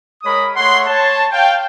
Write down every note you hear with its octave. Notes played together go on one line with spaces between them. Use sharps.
G#3 A#4 C#5 B5 D#6
A3 C#5 F#5 C6
C#5 A5
F5 G5